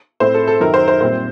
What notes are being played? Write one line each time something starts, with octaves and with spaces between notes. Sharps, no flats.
A2 A3 C4 C5
A4
A4
F#2 D#3 F#3 A#4
C5
C5
A#2 G3 C4 C5